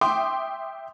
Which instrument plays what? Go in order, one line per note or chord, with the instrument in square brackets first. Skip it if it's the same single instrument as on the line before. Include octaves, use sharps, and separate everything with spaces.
[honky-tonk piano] E5 G5 C6 D6 D#6